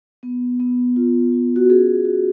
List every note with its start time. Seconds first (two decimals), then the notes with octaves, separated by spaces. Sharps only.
0.23 B3
0.60 B3
0.96 F4
1.32 F4
1.56 F#4
1.69 C#4 G#4
2.05 F#4